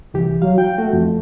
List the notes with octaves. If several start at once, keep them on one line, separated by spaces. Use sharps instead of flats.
C2 E3 G4
F#3 F5
G5
A3 F#4
F2